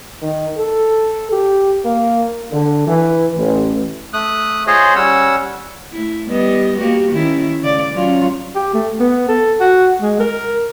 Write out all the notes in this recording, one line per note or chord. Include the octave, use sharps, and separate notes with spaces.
D#3
A4
G4
A#3
D3
E3
A1
A3 D#6 F#6
F4 G#4 C5 C#5 D#5
G3 C#4 F#5 E6
A3 E4
G3 B3 D#5
A#3 F#4 G4
D#3 C#4 E4
C#3 D5
F#3 C#4 F4
G4
A3
B3
A4
F#4
G#3
A#4